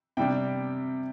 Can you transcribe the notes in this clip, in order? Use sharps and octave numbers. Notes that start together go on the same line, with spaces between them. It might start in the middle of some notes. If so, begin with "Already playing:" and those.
C3 G3 D4 G5